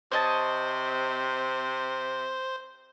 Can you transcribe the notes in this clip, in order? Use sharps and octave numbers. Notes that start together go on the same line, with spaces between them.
C3 C5 C#5 D#5 A5